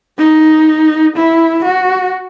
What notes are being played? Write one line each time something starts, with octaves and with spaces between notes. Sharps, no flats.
D#4
E4
F#4